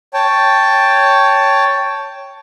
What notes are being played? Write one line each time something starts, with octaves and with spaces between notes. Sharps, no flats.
C#5 G5 A5